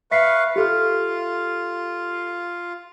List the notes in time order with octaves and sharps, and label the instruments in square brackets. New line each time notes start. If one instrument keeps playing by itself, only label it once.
[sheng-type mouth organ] B4 F5 C#6 [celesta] E5 B6 C7
[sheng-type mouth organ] F4 [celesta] G4 A4 F6